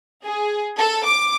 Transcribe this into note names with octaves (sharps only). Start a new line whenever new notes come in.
G#4
A4
D6